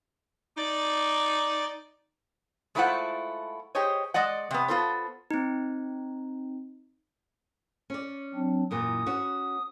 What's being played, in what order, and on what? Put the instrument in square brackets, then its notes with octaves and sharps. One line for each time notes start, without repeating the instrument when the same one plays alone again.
[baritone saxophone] D#4 [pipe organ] D5 A6
[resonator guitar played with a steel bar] G#3 A3 E4 F4 C5 F#5
G4 G#4 C5 C#5 D#5
G#3 D5 D#5 F#5
C3 B3
B3 F4 A4 C5
[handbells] C4 D#4
[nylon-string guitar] C#4 D5
[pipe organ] F#3 C4 D4
[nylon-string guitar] F#2 A#2 E3 [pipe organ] D#6
[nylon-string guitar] B3 C#4 F#4